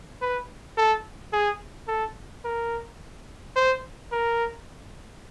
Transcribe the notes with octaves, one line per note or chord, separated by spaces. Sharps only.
B4
A4
G#4
A4
A#4
C5
A#4